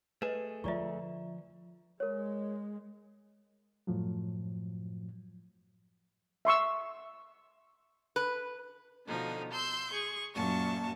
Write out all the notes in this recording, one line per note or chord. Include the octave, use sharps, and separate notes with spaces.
A3 G#4 B4 D#5 E7
D3 F3 F4 D5 E5 A#5 C#6
G#3 A#4 C#5
F#2 A2 F3 F#3
E5 C6 C#6 E6
B4
B2 D3 F3 D#4
C6 E6 G6
G#4 C#6
F#2 A#2 F#3 A#3 A5 C#6